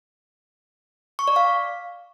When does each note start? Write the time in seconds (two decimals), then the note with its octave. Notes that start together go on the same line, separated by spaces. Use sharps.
1.19 C#6
1.28 D5
1.36 F5